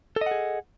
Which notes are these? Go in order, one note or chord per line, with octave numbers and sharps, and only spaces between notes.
G#4 A4 D#5 F#5